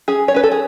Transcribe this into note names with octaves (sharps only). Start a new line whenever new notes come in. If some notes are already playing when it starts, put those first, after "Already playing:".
C#4 G#4
C#5
C#4 B4
A4
G#4